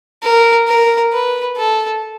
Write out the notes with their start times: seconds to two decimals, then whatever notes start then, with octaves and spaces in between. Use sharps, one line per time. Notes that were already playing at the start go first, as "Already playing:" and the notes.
0.23 A#4
0.68 A#4
1.13 B4
1.57 A4